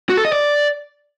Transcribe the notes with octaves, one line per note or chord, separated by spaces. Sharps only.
F#4
A4
D#5
D5